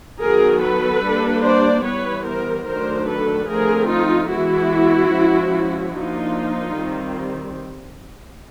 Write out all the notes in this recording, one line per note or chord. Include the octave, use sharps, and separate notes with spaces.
D#3 F#3 B3 G#4 A#4
A4 B4
G3 A#3 D4
C5 D5
E3 G3 B3 B4 C#5
A#4 C5
D#3 F#3 A3 D4 A#4 C5
A4 B4
D3 F3 A3 C4 G#4 A#4
D#4 F4
E3 G#3 B3 E4 F#4
F3 G#3 C#4
F3 A#3 D4 D#4 F4
D#3 G3 C4